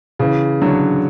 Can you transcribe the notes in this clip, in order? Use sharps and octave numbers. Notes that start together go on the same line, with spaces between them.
C#3 E3
D3 F#3